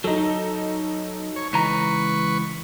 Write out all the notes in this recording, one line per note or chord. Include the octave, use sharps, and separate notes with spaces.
F#3 D#4 A4
C#5
C#2 E3 B4 A#5 C#6